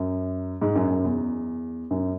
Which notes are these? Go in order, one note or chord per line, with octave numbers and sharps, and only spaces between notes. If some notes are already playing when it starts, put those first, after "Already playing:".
Already playing: F#2
G#2
F#2
F#2
E2
F#2